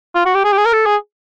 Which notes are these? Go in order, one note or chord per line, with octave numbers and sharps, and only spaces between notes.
F4
F#4
G4
G#4
G4
G#4
A#4
A4
G#4